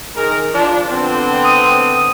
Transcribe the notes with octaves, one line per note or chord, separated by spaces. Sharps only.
D#3 G#4 A#4
F3 D4
D3 B3 C4
D#6